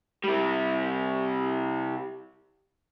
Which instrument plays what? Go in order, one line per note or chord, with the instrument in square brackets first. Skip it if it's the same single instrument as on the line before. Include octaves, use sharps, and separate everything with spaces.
[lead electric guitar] C3 G3